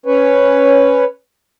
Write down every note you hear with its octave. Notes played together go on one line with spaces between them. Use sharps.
C#4 B4 C#5